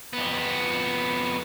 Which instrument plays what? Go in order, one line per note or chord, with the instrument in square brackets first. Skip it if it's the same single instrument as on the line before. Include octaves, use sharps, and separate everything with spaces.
[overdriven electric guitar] F2 B3